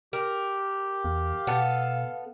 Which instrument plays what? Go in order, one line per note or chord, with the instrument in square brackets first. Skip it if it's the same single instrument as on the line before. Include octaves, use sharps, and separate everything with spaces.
[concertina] G4 [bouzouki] A#4
[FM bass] E2 [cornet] F5
[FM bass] B2 [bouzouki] B3 A4